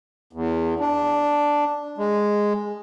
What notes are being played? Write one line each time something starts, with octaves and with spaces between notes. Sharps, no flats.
E2
D4
G#3